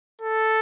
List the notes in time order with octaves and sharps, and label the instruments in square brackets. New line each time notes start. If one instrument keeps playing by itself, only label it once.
[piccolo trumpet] A4